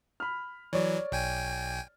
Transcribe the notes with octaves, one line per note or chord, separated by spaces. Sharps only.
B5 F6
E3 F#3 C#5 D5
B1 G5 G#5